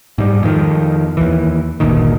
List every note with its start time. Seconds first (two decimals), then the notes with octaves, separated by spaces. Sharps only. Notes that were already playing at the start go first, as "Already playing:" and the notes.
0.18 G#2 G3
0.43 F2 D#3
1.17 D#2 E3
1.80 G1 D2 A#2 D#3